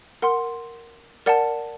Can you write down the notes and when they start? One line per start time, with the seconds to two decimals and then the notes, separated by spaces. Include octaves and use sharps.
0.22 A#4 F#5 C6
1.26 A#4 D5 F#5 A5